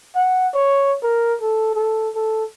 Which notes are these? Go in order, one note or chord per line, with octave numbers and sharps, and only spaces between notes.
F#5
C#5
A#4
A4
A4
A4